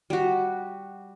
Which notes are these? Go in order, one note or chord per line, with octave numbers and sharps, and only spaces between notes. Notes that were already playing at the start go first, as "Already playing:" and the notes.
G3 F#4